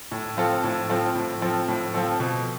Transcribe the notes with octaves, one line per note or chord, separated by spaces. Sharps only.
A2
F3 C4 F4 A4
A2
F3 C4 F4 A4
A2
F3 C4 F4 A4
A2
F3 C4 F4 A4
B2